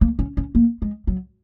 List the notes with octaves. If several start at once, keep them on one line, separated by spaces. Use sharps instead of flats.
A#3
C#4
C#4
A#3
G#3
F#3